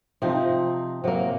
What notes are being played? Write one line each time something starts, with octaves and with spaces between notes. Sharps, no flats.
C3 F3 C4 D#4
C3 F#3 A#3